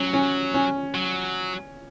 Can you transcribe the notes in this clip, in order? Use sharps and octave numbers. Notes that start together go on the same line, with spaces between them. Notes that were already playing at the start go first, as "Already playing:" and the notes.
Already playing: F#3 C#4
C#4
C#4
F#3